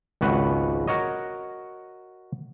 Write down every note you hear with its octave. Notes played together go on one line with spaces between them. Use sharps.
G#1 C#2 F#4 B4 F#5
F#4 A#4 C#5 D#5